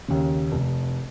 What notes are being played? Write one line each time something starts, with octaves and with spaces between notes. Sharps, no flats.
D#2 C#3
F1